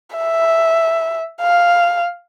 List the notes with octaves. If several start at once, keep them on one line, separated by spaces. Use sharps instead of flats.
E5
F5